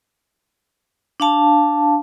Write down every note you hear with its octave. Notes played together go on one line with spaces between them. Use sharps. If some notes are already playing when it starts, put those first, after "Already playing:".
D4 F5 A5